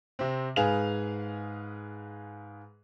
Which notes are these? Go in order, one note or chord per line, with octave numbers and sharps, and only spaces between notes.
C3 C4
G#2 G#4 B4 F5 G#5 F7